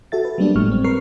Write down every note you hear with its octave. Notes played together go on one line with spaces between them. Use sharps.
F#4 A4 E5 A6
B4
F#3 G3 A#3 B3 D4 G4
G#1 A2 G#3 C#6 F6
C4
A#4 B4 C#6 F6 C7